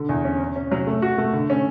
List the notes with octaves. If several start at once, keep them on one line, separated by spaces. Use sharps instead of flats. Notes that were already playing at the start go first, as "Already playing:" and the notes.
Already playing: D3
E2
C#4
C#4
C#4
F#3
A3
F#4
A3
D3
C#4